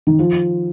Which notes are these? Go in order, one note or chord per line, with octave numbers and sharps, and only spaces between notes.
D#3
F3